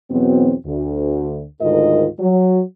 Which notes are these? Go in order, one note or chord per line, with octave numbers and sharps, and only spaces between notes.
E2 B2 F#3 B3 C4
D2
D2 G#2 D#3 F4 A#4 D#5
F#3